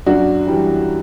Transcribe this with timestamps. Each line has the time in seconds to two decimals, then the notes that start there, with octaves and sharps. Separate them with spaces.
0.06 F#2 D4 F#4
0.47 E3 G3